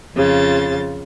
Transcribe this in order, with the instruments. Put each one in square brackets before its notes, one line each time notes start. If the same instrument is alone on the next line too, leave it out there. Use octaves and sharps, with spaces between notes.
[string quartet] F2 C#3 F4 A6